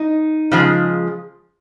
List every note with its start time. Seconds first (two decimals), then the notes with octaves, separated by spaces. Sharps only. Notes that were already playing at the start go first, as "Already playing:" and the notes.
Already playing: D#4
0.52 C#3 F3 G#3